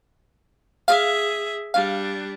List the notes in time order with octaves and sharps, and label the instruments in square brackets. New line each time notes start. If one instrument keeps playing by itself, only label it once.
[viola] G#4 E5 [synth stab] F5
[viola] G3 D4 [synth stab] F5